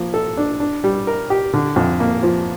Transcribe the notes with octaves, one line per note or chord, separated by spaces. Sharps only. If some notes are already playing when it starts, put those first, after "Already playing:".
Already playing: F3 A#3
A4
D4
D4
G3
A#4
G4
D3
F2
A#3
F3